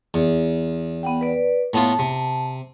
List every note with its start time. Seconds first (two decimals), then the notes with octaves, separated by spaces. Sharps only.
0.14 E2
1.03 B3 F#5 G5
1.21 B4 D5
1.74 A2 B3 F4 A5
1.99 C3